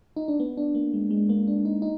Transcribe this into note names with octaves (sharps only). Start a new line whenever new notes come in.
D#4
D4
B3
D4
A#3
G#3
G#3
A#3
D4
D#4
D#4